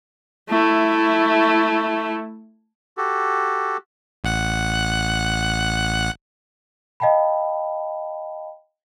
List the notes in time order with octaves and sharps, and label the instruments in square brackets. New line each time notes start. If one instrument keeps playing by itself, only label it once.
[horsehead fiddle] A3 E4
[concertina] F#4 G4 A4
[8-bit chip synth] A1 F#5 F#6
[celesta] D#5 F5 G5 A5 B5